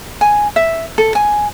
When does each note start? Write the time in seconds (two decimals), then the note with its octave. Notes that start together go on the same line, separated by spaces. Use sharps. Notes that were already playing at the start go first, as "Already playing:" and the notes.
0.21 G#5
0.56 E5
0.98 A4
1.15 G#5